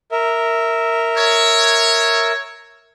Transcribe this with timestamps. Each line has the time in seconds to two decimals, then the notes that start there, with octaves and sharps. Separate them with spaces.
0.12 A#4 E5
1.17 C#5